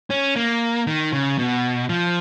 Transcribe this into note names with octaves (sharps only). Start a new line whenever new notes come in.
C#4
A#3
D#3
C#3
B2
F3